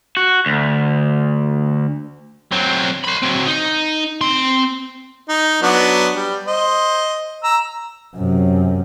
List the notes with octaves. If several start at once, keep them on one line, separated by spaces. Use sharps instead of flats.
F#4
D2
F#3 C4
C5 B5
F#3 C4
D#4
C4 C6
D#4
F#3 B3 D4
G3
C5 D#5
A#5 E6
F#2 C3